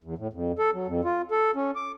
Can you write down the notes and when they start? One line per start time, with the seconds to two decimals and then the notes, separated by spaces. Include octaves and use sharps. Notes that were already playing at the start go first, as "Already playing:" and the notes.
0.04 E2
0.18 A2
0.33 F2
0.59 A4
0.74 F#3
0.87 F2
1.05 F4
1.31 A4
1.56 C#4
1.76 D6